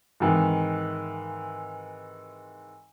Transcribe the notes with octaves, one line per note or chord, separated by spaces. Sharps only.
G#2 C3 D#3 E3